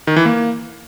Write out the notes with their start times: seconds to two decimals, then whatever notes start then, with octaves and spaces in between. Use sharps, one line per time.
0.07 D#3
0.16 E3
0.26 A#3